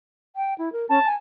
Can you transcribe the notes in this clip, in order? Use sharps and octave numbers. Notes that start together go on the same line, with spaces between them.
G5
E4
A#4
C#4 A5
G#5